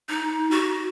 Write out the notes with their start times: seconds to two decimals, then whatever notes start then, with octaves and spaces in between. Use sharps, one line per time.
0.09 D#4
0.51 F#4